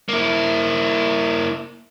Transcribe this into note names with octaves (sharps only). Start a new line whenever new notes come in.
A#3 E4